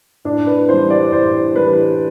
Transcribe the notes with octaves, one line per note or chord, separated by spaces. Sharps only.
A2 D4
B4
E3 G3 C5
D5
A2 C5
E3 G3 B4